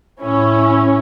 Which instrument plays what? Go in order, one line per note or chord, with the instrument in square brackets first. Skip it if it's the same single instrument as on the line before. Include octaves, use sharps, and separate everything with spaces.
[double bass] A2 E4 [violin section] C#4